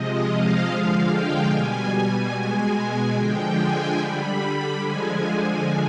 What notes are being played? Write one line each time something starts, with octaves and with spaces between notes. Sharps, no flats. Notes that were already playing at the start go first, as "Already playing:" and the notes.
Already playing: C3 F3 G#3 D#5
F5
D3 F3 G#3
G5
B2 G3 G#5
B2 G#3
G#5
D3 F3 G#3 G5
G#5
D3 G3 B5
D3 F3 G#3 G#5